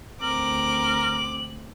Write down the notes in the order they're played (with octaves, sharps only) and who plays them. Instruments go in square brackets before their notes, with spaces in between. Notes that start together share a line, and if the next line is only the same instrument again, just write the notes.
[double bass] D2 C4 [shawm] A#4 [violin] D6 [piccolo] F#7